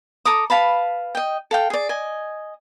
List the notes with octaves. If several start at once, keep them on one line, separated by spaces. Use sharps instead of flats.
A4 A#5 D6 D#6
B4 F5 A5 B5
D#5 G5
A4 F5 G5
G#4 D5
D#5 G#5